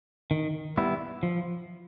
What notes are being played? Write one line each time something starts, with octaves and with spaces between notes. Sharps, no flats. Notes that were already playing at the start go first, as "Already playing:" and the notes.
D#3
G3 B3 E4
F3